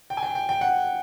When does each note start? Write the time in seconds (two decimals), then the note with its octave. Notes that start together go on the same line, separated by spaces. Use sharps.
0.10 G5
0.17 G#5
0.23 G5
0.35 G5
0.49 G5
0.61 F#5